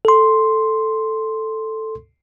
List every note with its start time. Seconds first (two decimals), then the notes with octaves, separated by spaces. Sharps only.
0.05 A4 C6